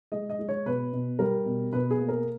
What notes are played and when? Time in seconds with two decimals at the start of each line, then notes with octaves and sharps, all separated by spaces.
0.12 G#3 D#5
0.30 D#5
0.39 G#3
0.49 C#5
0.66 B2 B4
0.93 B2
1.19 G3 A#4
1.46 B2
1.73 B2 B4
1.91 G#4
1.99 A#3
2.08 A#4